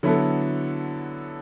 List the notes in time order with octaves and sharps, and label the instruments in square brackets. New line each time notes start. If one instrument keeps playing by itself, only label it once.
[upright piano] D3 F#3 B3 E4 A4